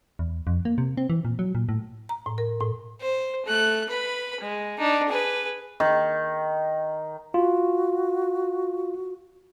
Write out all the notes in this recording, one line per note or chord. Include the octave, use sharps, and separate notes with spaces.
E2
F2
A#3
C3
C4
E3
A#2
F#3
A#2
A2
A#5
A2
A#4
A2
C5
A3 F#6
B4 B5
G#3
D4 D#4
G#4 B4
D#3
F4 F#4